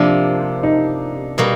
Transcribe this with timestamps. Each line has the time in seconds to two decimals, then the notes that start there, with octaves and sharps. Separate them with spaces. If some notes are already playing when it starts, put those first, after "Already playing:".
Already playing: C3 F3 A#3 D4
0.63 D#4
1.38 B2 G3 A#3